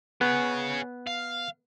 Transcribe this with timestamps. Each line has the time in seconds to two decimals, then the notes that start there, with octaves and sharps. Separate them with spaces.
0.21 B3 G#4 C#5
1.07 F5